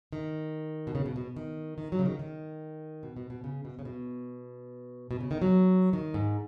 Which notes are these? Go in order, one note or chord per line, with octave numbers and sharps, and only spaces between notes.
D#3
B2
C#3
B2
B2
D#3
D#3
F#3
C#3
D#3
D#3
B2
B2
B2
C#3
B2
C#3
B2
B2
C#3
D#3
F#3
D#3
G#2